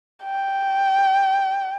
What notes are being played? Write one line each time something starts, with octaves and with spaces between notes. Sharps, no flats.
G5